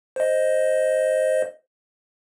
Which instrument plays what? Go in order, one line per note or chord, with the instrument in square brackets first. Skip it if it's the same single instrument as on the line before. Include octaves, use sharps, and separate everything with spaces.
[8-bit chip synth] C5 D#5